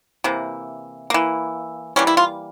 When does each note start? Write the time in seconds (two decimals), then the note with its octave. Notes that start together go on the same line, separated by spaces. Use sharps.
0.24 C3 E3 A#3
1.10 E3 A#3
1.96 E3 G3 A#3 C#4
2.07 E4
2.17 F4